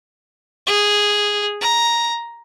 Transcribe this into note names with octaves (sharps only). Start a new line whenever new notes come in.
G#4
A#5